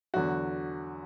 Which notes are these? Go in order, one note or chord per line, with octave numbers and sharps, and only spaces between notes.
E2 D3 F#3 F#4